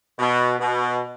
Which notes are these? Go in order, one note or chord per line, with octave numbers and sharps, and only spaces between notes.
B2
B2